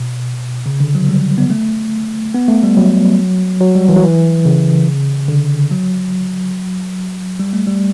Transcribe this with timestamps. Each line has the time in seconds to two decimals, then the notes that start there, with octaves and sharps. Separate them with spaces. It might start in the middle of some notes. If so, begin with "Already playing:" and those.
Already playing: B2
0.66 C#3
0.80 D3
0.95 F#3
1.09 G3
1.38 B3
1.50 A3
2.34 B3
2.48 A3
2.63 G3
2.77 F#3
3.60 F#3
3.75 G3
3.89 E3
3.96 F#3
4.03 E3
4.45 C#3
5.28 D3
5.71 F#3
7.39 G3
7.53 A3
7.67 G3